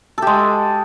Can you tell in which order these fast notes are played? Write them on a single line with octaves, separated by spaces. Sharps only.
A4 G4 G#3